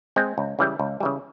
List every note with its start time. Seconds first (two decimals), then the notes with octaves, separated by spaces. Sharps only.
0.16 G#3 C4
0.38 C#2
0.59 C#3 E3 G3
0.79 C#2
1.00 C#3 E3 G3